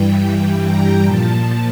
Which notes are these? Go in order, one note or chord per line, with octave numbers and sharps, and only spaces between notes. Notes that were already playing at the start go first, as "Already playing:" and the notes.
Already playing: G2 E3 G3 G5
A#5
A#2 F3 A5